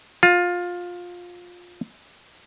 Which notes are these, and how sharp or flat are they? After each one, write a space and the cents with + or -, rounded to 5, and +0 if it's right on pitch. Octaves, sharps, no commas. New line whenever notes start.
F4 +15